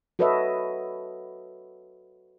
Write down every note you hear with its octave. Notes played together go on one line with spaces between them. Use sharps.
F#4 A4 B4 C#5 D#5 E5